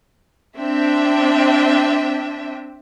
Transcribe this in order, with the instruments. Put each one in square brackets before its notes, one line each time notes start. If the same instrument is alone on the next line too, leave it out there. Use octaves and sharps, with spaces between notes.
[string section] C4 D4 E5 G5